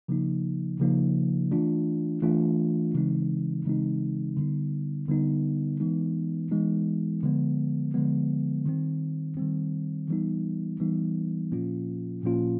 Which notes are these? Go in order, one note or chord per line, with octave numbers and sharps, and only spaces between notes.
C#3 F3 A#3 D#4
C#3 F3 A#3 D#4
E3 A3 D4 F4
E3 A3 D4 F4
C#3 E3 G#3 C4 D#4
C#3 E3 G#3 C4 D#4
D3 G3 B3 D#4
D3 G3 B3 D#4
E3 G#3 B3 D#4
E3 G#3 B3 D#4
D3 F3 G#3 B3
D3 F3 G#3 B3
D#3 G3 C4
D#3 G3 C4
E3 G3 B3 D#4
E3 G3 B3 D#4
A#2 F3 A#3 C#4 F4
A#2 F3 A#3 C#4 F4